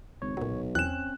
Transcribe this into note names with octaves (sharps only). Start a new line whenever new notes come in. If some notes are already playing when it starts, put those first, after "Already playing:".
G#1 C#2 C#5
B1 A#2 F#3
E2 C4 C#4 F#6 E7